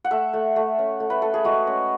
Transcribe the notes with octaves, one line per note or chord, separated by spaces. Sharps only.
F#5
A3 E5
A3
A3
C#4
A3
B4
A3 A4
G#4
G#3 F#4
C#4